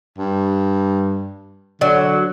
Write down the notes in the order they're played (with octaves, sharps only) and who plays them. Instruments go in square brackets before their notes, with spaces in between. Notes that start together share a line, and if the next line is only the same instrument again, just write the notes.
[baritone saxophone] G2
[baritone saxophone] D3 [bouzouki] F#3 [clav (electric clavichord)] D5